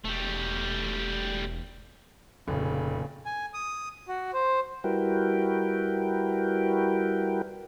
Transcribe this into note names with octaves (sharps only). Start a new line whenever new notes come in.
E1 G3 A3
F1 A#2 C#3
G#5
D#6
F#4
C5
G3 E4 F#4 A#4 B4 G5